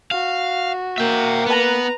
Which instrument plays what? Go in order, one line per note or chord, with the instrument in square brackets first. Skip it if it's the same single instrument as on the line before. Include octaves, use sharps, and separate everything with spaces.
[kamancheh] F#4 [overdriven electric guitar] F5
[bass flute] A#3 [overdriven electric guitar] E5 G5
[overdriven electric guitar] B3 [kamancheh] B4 A#5